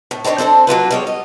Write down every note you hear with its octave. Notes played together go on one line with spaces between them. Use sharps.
A2
C4 D4 D#4 B4 C#5
C4 D4 A4 C5
F#3 A#3 F4 B4
G3 G#3 C#5
D#5